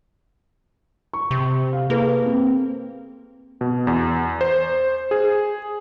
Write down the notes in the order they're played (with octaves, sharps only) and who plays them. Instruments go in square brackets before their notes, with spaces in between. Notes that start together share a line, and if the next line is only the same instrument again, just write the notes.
[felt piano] C#6
[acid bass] C3
[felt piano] F5
[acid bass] A#3 [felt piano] G#4 A4 B4
[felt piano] C4
[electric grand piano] B2
E2
C5
G#4